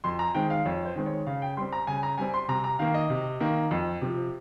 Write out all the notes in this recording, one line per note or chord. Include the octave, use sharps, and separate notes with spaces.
F2 C6
A#5
D#3 G#3 C4 G5
F5
F2 C#5
C5
D#3 G#3 C4
C#5
C#3 F5
G5
G3 C4 C6
A#5
C#3 G#5
A#5
G3 C4 G#5
C6
C3 A#5
A#5
D#3 A#3 F5
D#5
C3
D#3 A#3
F2
C3 F3